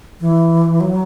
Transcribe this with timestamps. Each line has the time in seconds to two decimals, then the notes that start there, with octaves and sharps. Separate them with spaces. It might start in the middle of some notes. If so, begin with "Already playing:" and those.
0.20 E3
0.80 F#3